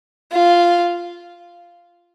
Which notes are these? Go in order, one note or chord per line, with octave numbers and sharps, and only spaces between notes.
F4